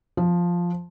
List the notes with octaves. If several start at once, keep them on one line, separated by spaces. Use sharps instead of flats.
F3